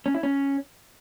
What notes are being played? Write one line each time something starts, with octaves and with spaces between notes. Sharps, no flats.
C#4
E4
C#4